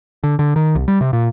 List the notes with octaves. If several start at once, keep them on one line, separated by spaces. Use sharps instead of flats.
D3
D3
D#3
C2
G3
C3
A#2